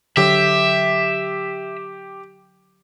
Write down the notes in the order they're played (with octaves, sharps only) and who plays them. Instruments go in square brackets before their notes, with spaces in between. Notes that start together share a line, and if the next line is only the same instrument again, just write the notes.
[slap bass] D3 F#3 [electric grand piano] G4 [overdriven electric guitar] E5